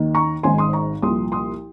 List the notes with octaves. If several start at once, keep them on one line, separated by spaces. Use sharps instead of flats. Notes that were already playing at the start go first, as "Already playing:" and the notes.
Already playing: D#2 D#3
A#5 C#6
G#1 G#2 D#3 G#5 C6
C6 D#6
A#5 C#6
C2 A#2 F3 C6 D#6
C6 D#6